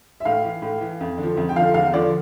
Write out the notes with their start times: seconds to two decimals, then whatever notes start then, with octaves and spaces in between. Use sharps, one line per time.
0.20 E5
0.25 A2 F5
0.44 E3
0.62 A2
0.81 E3
1.00 F2
1.18 D3
1.23 F3
1.37 F2
1.49 G5
1.56 D3 F3 F5
1.74 E2 F5
1.94 D3 F3 D5